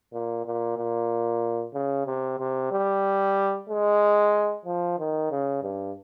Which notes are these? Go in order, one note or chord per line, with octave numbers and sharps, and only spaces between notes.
A#2
A#2
A#2
C#3
C3
C3
G3
G#3
F3
D#3
C#3
G2